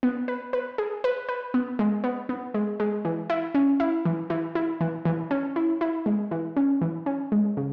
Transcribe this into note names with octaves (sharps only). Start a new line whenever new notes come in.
B3
B4
B4
G#4
B4
B4
B3
G#3
B3
B3
G#3
G#3
E3
E4
C#4
E4
E3
E3
E4
E3
E3
C#4
E4
E4
G#3
E3
C#4
E3
C#4
G#3
C#3